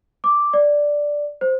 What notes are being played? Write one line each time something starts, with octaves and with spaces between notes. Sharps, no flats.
D6
D5
C5